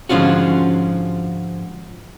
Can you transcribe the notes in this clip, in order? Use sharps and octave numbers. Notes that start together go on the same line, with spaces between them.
G#2 D3 F3 C#4 F4 F#4